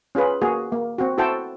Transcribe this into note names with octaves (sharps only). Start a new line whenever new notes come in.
C#4 F4 G#4 B4
A#3 F#4 G#4
A#3
C4 F#4
E4 F#4 A4 C5 G5 A5